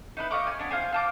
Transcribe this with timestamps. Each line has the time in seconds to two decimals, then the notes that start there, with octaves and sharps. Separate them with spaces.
0.17 D#4 E4 B4
0.31 D#5 F5 C#6 D6
0.47 G#5
0.59 B3 D4
0.70 F4 C5 G#5
0.92 F4 A5 D6